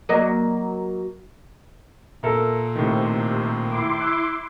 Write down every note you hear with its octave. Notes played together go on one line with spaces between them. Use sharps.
F#3 A#3 D#5
A#2 A4 A#4 E5
A2 C3 D#3
E4 C6 D6
E6 F#6